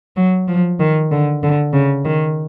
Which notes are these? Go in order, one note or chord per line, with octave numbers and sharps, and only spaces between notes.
F#3
F3
D#3
D3
D3
C#3
D#3